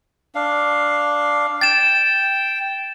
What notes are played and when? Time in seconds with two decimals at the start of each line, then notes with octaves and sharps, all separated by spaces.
0.35 D4 F5
1.61 G5 A6 E7